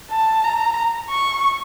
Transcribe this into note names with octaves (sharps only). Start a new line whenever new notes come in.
A5
A#5
C#6